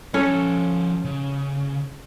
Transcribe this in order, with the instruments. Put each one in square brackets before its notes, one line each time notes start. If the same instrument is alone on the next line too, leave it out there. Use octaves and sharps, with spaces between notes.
[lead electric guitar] F3 C#5 [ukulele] C#4 A4
[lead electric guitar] C#3